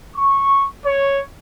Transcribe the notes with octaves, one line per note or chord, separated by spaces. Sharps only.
C#6
C#5